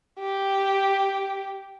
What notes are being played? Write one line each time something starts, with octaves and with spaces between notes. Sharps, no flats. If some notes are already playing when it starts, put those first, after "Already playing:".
G4